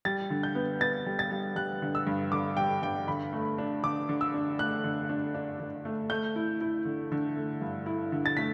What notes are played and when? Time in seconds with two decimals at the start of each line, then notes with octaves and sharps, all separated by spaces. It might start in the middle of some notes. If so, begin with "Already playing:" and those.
0.05 G3 A6
0.30 D3
0.43 G6
0.55 B3
0.81 B3 A6
1.06 G3
1.19 A6
1.31 G3
1.56 G3 F#6
1.82 D3
1.95 E6
2.07 G2
2.32 D3 D6
2.57 G3 G5
2.82 G2 G5
3.08 D3 B5
3.33 A3
3.58 D4
3.83 D3 D6
4.09 D3
4.21 E6
4.34 D4
4.59 A3 F#6
4.84 D3
5.09 D4
5.34 D4
5.60 D3
5.85 A3
6.10 A3 G6
6.36 E4
6.61 E4
6.85 D3
7.12 D3
7.37 A3
7.61 G2
7.86 E4
8.12 D3
8.26 A6
8.37 A3 B6